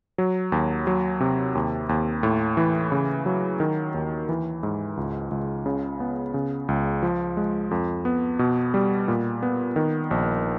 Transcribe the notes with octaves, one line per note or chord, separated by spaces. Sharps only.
F#3
D#2
F#3
C3
D#2
D#2
A2
E3
C#3
F#3
D#3
D#2
E3
G#2
C#2
C#2
C#3
B3
C#3
C#2
F3
G#3
F2
B3
B2
G3
A#2
B3
D#3
A#1